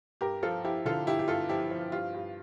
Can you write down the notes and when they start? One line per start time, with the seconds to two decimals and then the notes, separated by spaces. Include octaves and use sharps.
0.21 G2 G4 A#4
0.43 F3 F4 A4
0.64 F3 E4 G4
0.85 D3 F4 A4
1.07 G2 E4 G4
1.19 G4
1.28 G2 F4 A4
1.49 F3 E4 G4
1.71 F3
1.92 G2 F4
2.14 G2